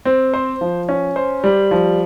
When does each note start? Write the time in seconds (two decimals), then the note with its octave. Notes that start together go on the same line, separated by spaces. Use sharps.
0.05 C4
0.34 C5
0.61 F3
0.89 C#4
1.16 C5
1.44 G3
1.71 F3